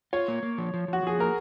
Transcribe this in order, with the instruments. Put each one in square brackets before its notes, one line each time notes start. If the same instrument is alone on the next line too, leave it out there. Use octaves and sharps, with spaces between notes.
[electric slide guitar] F4 [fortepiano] C#5
[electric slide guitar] A#3
A#3
F3
F3
[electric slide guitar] F3 [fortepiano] F#4
[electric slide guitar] F3 [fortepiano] G#4
[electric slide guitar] A#3 [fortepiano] A#4